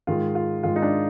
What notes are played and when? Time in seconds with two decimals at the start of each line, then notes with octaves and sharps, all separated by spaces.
0.07 G#2 D#3 G#3 F4
0.35 F4
0.63 G#2 D#3 G#3 F4
0.76 D#4
0.82 D4